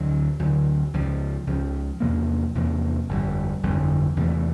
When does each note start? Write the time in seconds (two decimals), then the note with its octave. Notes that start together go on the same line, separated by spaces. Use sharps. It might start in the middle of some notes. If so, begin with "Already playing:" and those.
Already playing: D2 D3 F#3
0.39 D2 D3 F#3
0.93 C#2 C#3 F3
1.47 C#2 C#3 F3
2.00 E2 C3 F3 A#3
2.55 E2 C3 F3 A#3
3.09 G1 F2 D3 G3
3.63 G1 F2 D3 G3
4.16 E2 C3 E3 A3